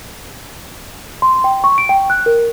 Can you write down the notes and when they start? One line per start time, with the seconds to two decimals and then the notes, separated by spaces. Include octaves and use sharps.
1.22 C6
1.44 G5
1.64 C#6
1.78 D7
1.89 G5
2.10 F#6
2.26 A#4